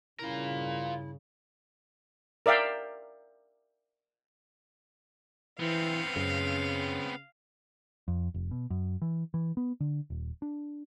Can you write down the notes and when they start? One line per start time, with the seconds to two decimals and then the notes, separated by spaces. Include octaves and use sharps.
0.19 G2 C#3 E4 F4 A#4
2.46 A#4 D5 E5 F5 G5
5.60 E3 B3 C4 F5
6.16 F#2 C#3
8.08 F2
8.34 F1
8.51 B2
8.70 F#2
9.02 E3
9.34 E3
9.57 B3
9.80 D3
10.10 D#1
10.42 D4